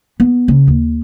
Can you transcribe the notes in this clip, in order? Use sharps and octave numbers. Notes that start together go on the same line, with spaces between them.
B3
C#3
D#2